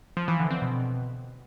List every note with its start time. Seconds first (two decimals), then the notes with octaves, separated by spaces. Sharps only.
0.17 F3
0.28 E3
0.39 D3
0.51 C4
0.62 B2